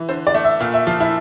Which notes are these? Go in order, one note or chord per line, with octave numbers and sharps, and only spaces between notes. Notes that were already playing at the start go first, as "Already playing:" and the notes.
Already playing: E3
D3 C5
D5
A3
E5
A#2 F5
E5
F3 F4
E4